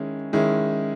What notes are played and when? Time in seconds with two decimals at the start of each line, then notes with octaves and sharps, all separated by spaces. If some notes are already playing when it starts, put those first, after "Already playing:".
Already playing: D#3 G#3 C#4 E4
0.33 D#3 G#3 C#4 E4